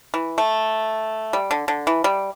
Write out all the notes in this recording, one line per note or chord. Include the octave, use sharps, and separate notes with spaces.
E3
A3
G3
D3
D3
E3
G3